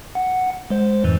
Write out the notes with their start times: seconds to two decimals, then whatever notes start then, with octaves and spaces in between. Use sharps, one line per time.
0.15 F#5
0.70 G#3 C5
1.04 F2 G#2 E3